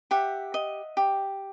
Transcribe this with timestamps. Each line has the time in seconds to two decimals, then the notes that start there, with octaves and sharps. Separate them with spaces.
0.11 G4 E5 F#5
0.54 D#5
0.97 G4